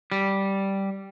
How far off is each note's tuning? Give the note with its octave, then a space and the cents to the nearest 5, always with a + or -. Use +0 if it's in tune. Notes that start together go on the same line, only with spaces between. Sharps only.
G3 -5